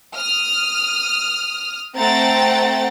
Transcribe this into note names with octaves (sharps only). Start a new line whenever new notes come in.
D#6 F6
A3 C4 F#5 G5 A#5 A6